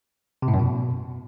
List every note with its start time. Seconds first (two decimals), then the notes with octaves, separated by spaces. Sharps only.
0.42 C3
0.48 A2
0.54 F#2
0.59 B2